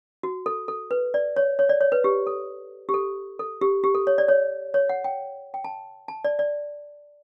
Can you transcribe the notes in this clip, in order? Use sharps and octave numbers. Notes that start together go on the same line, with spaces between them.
F#4
A4
A4
B4
D5
C#5
C#5
D5
C#5
B4
G4
A4
G4
A4
A4
G4
G4
A4
C#5
D5
C#5
C#5
F#5
G5
G5
A5
A5
D5
D5